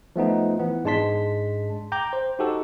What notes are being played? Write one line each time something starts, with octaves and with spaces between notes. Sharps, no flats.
F3 A3 B3 D#4
E3 B3
G#2 G#3 D4 A5 C6 B6
G5 A#5 D6 G6
C5
D#4 F#4 G4 A4